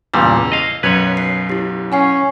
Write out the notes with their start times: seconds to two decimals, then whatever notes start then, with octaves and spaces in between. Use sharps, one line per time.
0.14 E2 G2 A#2 C#3 G3 E6
0.52 D#5 F5
0.83 B1 F#2 B4 C#5 G#6
1.17 C7
1.49 E4 G4
1.92 C#4 F#5 G#5 C7